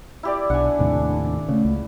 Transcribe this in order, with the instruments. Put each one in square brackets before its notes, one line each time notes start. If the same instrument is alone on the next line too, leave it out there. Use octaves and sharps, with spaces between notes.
[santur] E4 G4 D5
[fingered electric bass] B1 [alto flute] D4 [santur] F#5 G#5
[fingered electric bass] D#2 A2 C3
[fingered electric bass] C#3 [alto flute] A3
[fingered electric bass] C#2